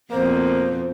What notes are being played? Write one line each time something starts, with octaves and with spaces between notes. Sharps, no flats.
F2 B2 A#3 C5